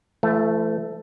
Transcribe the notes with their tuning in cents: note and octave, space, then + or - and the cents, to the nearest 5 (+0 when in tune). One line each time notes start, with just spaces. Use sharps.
E3 +45 A3 +0